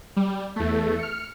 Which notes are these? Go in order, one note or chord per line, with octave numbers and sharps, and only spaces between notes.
G3
E2 A3
F6 C#7